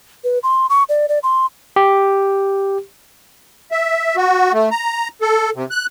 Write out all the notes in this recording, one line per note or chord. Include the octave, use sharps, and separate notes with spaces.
B4
C6
C#6
D5
D5
C6
G4
E5
F#4
A3
A#5
A4
C3
F#6